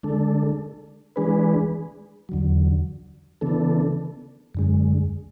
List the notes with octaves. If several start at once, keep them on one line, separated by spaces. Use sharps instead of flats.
D3 G#3 D4 A4
E3 G#3 D4 G#4 B4
E2 D3 F#3
C#3 E3 B3 D4 A4
F#2 D3 G#3